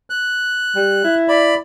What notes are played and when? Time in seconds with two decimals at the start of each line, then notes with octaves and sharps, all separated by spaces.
0.10 F#6
0.76 G3
1.04 E4
1.28 D5 B5